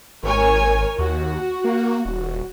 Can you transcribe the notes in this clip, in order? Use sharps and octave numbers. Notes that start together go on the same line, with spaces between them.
G#1 A#4 C#5 G#5
D#2 F#4
A#3
D#1